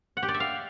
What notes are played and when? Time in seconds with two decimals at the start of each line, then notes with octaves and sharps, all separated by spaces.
0.17 F#5
0.23 G4
0.29 D5
0.34 E5
0.40 F5